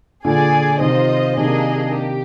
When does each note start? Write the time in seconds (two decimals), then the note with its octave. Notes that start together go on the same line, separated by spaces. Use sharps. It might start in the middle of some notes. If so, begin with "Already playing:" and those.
0.24 A#2 D3 G#4 D5 G#5
0.80 C3 D#3 F4 C5 D#5
1.37 C3 D#3 A#3 D4 G#4 D#5
1.93 G4